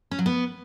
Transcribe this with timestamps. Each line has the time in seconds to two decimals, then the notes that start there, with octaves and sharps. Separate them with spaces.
0.11 C#4
0.19 F#3
0.26 B3